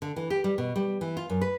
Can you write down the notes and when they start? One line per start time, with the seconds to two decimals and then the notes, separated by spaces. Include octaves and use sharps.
0.02 D3
0.16 E3
0.30 G4
0.44 G3
0.58 B2
0.76 G3
1.01 E3
1.17 F4
1.30 F#2
1.41 B4